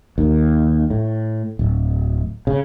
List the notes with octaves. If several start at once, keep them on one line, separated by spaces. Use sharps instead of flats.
D#2
A2
D1
C#3